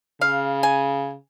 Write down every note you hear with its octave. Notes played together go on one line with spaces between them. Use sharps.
C#3 F5
G#5